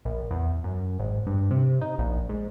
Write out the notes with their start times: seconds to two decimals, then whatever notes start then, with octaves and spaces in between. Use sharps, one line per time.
0.05 A#1
0.31 E2
0.64 F#2
0.99 G#1
1.26 G2
1.51 C3
1.81 D#4
1.98 A#1
2.29 G#2